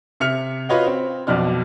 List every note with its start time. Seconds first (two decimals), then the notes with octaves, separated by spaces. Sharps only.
0.20 C3 E5 F6 C#7 F7
0.69 F4 F#4 B4 C#5 D#5 F#5
0.86 C4
1.27 B1 F2 B2 D5 F6